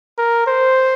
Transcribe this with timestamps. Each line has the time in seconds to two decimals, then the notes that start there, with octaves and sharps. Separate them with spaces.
0.18 A#4
0.47 C5